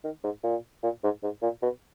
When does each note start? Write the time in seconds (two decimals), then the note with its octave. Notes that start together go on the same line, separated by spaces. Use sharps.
0.04 D#3
0.24 G#2
0.44 A#2
0.83 A#2
1.04 G#2
1.23 G#2
1.43 A#2
1.63 B2